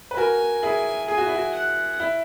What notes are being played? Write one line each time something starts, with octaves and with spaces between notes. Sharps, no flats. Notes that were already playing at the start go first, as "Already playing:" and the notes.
B4
F#4 A#4 G#5
E4 G#4
G#4 G#5
F#4
E4
F#4
F#5
E4